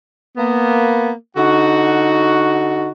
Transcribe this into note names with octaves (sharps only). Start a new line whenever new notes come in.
A#3 B3
D3 D#4 F#4